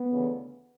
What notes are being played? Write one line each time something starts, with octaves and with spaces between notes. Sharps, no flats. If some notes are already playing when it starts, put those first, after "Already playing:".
Already playing: B3
D2 C#3 E3